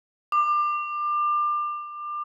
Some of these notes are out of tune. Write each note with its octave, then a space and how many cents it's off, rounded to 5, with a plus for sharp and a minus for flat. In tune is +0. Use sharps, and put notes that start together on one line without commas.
D6 +25